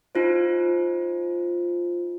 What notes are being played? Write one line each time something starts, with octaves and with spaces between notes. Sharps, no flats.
D#4 F4 C5